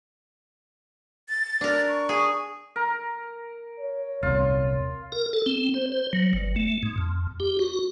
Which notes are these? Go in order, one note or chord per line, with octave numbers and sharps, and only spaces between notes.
A6
D4 A#4
C#6
G#4
A#4
C#5
D#1 C2 F4
A#4
A4
C4
C5
C5
F#3
G1
A3
G#2
F2
G4
F#4